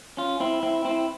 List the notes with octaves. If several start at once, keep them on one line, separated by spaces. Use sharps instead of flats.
C#4 F4
C4 E4
C4 E4
C4 E4